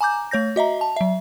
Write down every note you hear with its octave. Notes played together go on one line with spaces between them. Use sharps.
G#5 A#5 D6 G6
A3 C#5 G6 A#6
F#4 D#5 E5 A#5
A5
F#3 E5